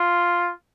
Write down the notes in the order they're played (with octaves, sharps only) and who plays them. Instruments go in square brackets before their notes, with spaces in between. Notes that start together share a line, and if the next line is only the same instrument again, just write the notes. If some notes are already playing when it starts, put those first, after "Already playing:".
Already playing: [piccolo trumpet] F4